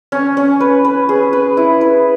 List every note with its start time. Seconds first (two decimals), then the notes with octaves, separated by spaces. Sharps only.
0.12 C#4
0.37 C#4
0.60 B4
0.85 B4
1.09 G#4
1.33 B4
1.57 E4
1.81 B4